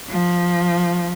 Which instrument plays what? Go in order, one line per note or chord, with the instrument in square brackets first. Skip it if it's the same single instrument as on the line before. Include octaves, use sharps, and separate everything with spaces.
[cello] F3